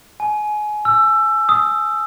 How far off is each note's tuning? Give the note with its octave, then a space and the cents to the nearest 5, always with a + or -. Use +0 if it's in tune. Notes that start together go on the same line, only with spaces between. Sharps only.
G#5 +25
E6 +20
D#6 +20